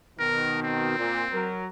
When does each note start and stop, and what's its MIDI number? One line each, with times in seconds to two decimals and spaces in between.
0.19 0.94 47
0.19 0.94 51
0.19 0.59 70
0.62 1.52 60
0.98 1.23 46
1.33 1.67 54
1.33 1.67 70